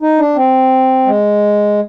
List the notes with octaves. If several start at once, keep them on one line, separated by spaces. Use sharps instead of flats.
D#4
D4
C4
G#3